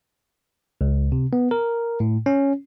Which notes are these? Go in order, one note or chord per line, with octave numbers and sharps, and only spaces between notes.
C#2
C3
B3
A#4
A2
C#4